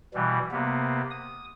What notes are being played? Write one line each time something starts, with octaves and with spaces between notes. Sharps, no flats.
B2 E3 G3
C3 A#3 B3
D#6